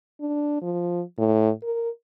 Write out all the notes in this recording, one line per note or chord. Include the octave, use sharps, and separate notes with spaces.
D4
F3
A2
A#4